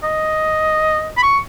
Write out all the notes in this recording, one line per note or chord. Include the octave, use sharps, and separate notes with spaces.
D#5
B5
C#6